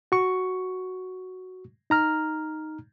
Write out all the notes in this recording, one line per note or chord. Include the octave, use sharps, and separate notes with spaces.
F#4 C#6
D#4 A#5 F6